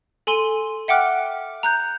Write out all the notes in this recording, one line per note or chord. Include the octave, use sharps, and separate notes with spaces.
A4 G#5 C6 D#7 G7
E5 F#5 G5 D6 F6 F#6
A#5 F#6 G6